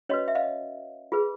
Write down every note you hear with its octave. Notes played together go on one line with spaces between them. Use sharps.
C#4 F#4 B4 C#5 D#5
E5
D#5 F5
F4 G#4 B4